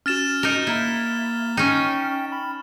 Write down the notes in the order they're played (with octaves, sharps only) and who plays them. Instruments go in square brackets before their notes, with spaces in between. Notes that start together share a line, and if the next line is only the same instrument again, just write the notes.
[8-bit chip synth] C#4 F#4 [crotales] F6 A6 E7
[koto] D#4 A#4
[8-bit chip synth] A#3 A#5 [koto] E4
[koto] C#4 D#4 [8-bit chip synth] G5
[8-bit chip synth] B5